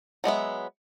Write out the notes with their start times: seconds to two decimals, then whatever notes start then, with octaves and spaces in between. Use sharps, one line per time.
0.24 F#3 G#3 B3 E5